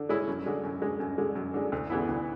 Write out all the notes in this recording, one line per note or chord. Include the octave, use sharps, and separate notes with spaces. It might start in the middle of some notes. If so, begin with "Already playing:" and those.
Already playing: D3
G#3 C#4 E4
F#2
D3 G#3
F#2
D3 G#3
F#2
D3 G#3
F#2
D3 G#3
D2
C#3 E3 B3 E4
D2